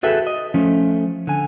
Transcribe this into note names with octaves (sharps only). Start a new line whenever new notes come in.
F#4 G#4 A4 B4 E5 G5
D#5
F3 A3 C#4
D3 G#5